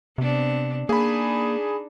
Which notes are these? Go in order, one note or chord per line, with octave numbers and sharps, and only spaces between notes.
C3 B3 C4 D4
A#3 D4 D#4 G#4 B5